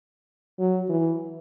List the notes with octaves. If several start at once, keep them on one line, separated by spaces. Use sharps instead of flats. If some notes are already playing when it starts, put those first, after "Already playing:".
F#3
E3